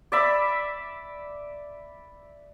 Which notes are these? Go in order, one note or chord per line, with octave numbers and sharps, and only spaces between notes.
D5 E5 B5